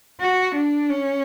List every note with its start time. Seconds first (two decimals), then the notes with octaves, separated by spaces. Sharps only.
0.21 F#4
0.55 D4
0.89 C#4